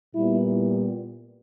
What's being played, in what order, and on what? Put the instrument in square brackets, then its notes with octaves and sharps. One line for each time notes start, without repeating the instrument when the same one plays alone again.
[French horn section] A#2 G3 B3 E4